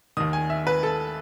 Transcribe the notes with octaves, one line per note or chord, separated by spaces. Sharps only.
D#2 D#3 D#6
G#5
E5
B4
A4